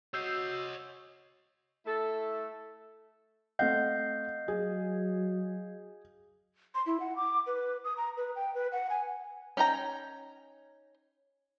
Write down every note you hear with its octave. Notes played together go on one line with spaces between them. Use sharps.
F#4 C#5 D#5 E6 G6 C7
A3 E4 A4
A3 C4 D#5 F5 F#5 G6
F#3 G#4
C6
E4
F#5
D6
B4
D#6
A#5
B4
G5
B4
F#5
G#5
C#4 D#4 G5 A#5